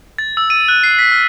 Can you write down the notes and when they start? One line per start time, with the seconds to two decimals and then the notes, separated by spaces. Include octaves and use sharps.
0.18 A6
0.37 E6
0.50 D#7
0.68 F#6
0.83 C7
0.99 B6
1.12 F6